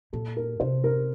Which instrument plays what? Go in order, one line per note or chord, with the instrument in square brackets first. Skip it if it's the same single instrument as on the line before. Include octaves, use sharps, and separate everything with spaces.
[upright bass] A#2 [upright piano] A4
[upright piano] A#4
[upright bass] C3 [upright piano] C5
[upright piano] A#4